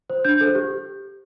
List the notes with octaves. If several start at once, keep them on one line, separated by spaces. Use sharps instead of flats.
C5
D4 G6
A4 C5
G4